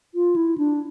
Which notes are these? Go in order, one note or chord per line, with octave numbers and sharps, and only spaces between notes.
F4
E4
D4